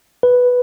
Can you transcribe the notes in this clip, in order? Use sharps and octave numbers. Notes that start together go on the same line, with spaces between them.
B4